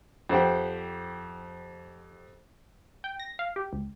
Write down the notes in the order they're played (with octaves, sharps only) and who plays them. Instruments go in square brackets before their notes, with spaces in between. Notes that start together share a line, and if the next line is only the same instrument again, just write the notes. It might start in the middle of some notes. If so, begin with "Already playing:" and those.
[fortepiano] F2 G4 C5 F#5 G5
[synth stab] G5
A#6
F5
G4
C#2